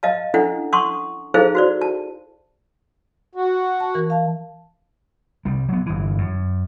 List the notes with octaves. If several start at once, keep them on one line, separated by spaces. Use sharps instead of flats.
D#5 F5 A5
C#4 D4 E4 A4 F#5
F#5 A5 C6 C#6 D#6
D#4 E4 G#4 A4 C5 F5
F#4 C5 D5
A5
F#4
A5
E3 A#4
F5 A5
C2 G3
F#3 B3
G1 E3
F#2